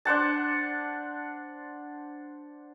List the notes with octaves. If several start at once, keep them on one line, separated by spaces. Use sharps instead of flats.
D4 C5 F#5 A5